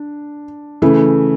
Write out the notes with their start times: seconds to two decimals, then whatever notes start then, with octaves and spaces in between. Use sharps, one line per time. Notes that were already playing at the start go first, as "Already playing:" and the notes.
Already playing: D4
0.82 C#3 E3 A3